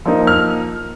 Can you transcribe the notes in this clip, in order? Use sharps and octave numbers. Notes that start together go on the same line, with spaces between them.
F3 A#3 D#4
F6